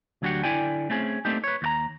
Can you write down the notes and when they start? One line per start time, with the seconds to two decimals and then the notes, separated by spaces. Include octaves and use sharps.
0.22 D2 F#3 D4 F#4 G4 F#5
0.44 D3 E4 D5 G5 G#5
0.90 A3 C4 C#4 G#4
1.25 A3 A#3 C4 D4 D#4 G4
1.44 B4 C#5
1.62 D#2 F#4 A#5